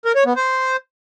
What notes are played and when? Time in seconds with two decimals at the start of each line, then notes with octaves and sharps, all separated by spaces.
0.05 A#4
0.16 C#5
0.26 B3
0.36 C5